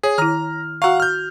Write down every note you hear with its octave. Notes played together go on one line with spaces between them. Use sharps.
G#4 C#5
D#3 E4 A#5 F6
F#4 F5 F#5 A#5 C#6
F6 G6